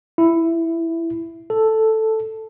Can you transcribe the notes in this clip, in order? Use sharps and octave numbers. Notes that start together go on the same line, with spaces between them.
E4
A4